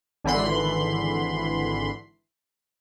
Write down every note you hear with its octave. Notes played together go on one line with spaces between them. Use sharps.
G#1 D3 E3 B5 C6